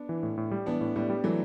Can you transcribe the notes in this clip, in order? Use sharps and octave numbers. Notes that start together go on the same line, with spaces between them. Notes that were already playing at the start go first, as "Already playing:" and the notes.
Already playing: B3 D4
E3
A2
A2
G3
E3 B3 D4
A2
A2 G3 B3
G3
E3 F#3 A3